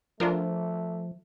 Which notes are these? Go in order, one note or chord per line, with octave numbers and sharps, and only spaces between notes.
F3 A3 D4 F4 A#4